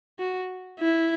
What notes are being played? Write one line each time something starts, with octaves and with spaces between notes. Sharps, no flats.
F#4
E4